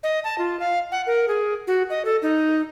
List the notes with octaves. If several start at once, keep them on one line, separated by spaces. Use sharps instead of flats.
D#5
A5
F4
F5
F#5
A#4
G#4
F#4
D#5
A4
D#4